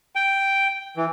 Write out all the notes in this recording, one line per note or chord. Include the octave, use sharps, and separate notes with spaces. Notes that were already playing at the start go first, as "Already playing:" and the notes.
G5
E3